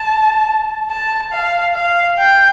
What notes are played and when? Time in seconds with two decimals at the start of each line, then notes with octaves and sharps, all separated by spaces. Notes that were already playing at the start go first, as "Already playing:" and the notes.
Already playing: A5
0.91 A5
1.32 F5
1.75 F5
2.19 G5